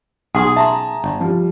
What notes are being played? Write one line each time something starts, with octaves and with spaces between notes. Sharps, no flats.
B1 G#4 F#5 C6 D#6
E5 A5 A#5 C6
G1
F3 G3